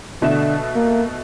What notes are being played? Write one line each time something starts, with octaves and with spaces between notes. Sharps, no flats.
B2 D3 A3 E7
A#3